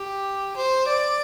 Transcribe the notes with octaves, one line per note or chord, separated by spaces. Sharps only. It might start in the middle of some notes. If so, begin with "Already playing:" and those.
Already playing: G4
C5
D5